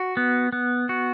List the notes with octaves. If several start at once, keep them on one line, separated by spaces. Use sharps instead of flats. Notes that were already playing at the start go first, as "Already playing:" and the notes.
Already playing: F#4
B3
B3
F#4